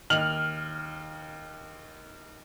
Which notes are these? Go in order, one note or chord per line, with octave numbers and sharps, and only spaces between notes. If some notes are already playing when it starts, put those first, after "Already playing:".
D#2 F6 F7 F#7